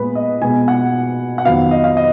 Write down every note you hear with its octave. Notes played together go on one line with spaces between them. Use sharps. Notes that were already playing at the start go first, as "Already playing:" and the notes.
Already playing: A#2 G#3 B3 B4
D#5
B2 G#3 B3 G#5
F#5
F#5
F2 D#3 F#3 B3 F5
D#5
F5
D#5